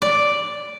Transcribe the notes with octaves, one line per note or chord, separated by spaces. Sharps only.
D5